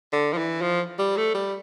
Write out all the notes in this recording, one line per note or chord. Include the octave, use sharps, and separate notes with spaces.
D3
F3
E3
F3
G3
A3
G3